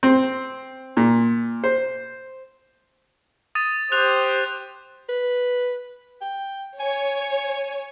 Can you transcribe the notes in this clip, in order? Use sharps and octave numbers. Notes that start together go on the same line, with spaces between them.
C4
A#2
C5
D#6 A6 D#7
G4 C5 F#6 F7
B4
G5
C#5 G#5